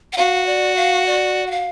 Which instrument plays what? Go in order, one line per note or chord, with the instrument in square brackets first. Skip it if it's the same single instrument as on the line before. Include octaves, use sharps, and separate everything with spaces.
[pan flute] F#5
[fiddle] F#4 [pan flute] F5
[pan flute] D5
F5
D5
F#5
F5